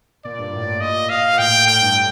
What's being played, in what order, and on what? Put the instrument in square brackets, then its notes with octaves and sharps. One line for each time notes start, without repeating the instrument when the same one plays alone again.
[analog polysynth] A#2 [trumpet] D5
[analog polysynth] G2
A2
A#2
[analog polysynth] A#2 [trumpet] D#5
[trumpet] F5
[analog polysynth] A#2
[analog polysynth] A2 [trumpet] G5
[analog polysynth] A2 [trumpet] G5
[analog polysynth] G2